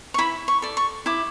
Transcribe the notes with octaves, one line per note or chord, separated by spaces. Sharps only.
C#6
E4 B5
C#6
A4 D5
C#6
E4 D6